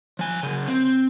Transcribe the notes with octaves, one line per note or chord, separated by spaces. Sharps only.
F3 G#5
C#3 F#3
C4